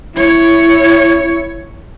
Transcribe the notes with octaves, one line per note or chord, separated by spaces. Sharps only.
E4 C#5